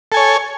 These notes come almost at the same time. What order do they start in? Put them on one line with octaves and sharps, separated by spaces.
A4 G#5 C#5